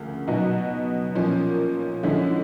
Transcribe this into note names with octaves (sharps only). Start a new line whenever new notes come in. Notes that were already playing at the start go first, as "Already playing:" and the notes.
Already playing: D2 C#3 F3 A#3
B2 F#3 B3 D#4 F#4
A#2 F3 A#3 C#4
D3 F3 G#3 C#4 E4